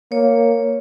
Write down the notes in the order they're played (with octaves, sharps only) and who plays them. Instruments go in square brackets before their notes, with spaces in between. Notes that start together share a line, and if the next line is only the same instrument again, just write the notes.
[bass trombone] A#3 [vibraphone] C#5